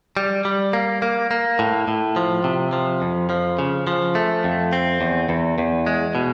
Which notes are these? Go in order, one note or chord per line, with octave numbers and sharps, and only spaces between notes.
G3
G3
A#3
A#3
A#3
A2
A2
F3
C3
F3
F2
F3
C#3
F3
A3
F2
C4
E2
E2
E2
G#3
B2